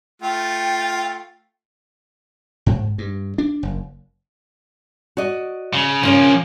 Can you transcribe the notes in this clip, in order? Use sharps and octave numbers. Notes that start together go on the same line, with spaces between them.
A3 F4 G5
G#2
G2
D4
F#1
F#4 D5 D#5
C#3
C#3 F3 A#3 C#4 C#5